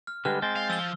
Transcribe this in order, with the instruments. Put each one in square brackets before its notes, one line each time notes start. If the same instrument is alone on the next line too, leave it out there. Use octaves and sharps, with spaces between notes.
[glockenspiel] F6
[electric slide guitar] D3 G3 G#3 [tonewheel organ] G4 B4 [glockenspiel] F6
[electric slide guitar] G#3 C4 [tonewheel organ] G6 A6
[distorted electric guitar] F5
[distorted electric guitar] F3 [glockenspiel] E6 G7